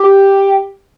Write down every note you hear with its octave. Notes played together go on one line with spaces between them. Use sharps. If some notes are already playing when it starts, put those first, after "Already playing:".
Already playing: G4